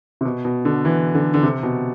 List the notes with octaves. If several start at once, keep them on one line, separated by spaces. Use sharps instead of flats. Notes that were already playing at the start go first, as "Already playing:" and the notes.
C3
B2
B2
D3
E3
D3
D3
C3
B2